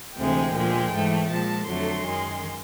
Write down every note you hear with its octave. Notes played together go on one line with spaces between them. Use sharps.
D2 C3 E3 G#3 G5
A#2 F3 G#3
G#2 E3 A3
A#2 F3 G#3 A5
F2 D3 F#3 A3 C6
F#2 D#3 G#3